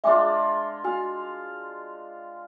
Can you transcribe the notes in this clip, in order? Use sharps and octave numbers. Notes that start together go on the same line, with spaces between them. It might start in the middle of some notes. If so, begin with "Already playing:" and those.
G#3 D4 F4 E5 G#5 D6
F#4 F5 G#5